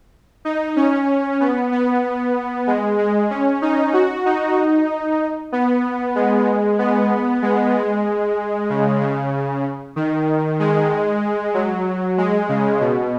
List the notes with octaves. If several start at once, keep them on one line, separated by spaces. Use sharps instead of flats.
D#4
C#4
B3
B3
G#3
G#3
C#4
D#4
F#4
D#4
B3
G#3
B3
G#3
G#3
C#3
C#3
D#3
G#3
F#3
G#3
C#3
B2